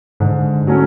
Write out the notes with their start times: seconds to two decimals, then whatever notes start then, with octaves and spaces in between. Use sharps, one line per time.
0.20 G#2 D3
0.67 F#3 A3 C#4